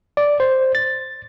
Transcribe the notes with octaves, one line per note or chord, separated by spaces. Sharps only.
D5
C5
A6